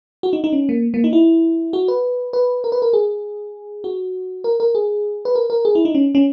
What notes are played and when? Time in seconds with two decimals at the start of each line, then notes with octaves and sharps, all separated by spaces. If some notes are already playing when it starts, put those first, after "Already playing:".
0.23 F#4
0.33 D#4
0.44 D#4
0.53 C#4
0.69 A#3
0.94 A#3
1.04 D#4
1.13 E4
1.73 F#4
1.88 B4
2.33 B4
2.64 A#4
2.72 B4
2.82 A#4
2.93 G#4
3.84 F#4
4.44 A#4
4.60 A#4
4.75 G#4
5.25 B4
5.35 A#4
5.50 A#4
5.65 G#4
5.75 E4
5.85 D#4
5.95 C#4
6.15 C#4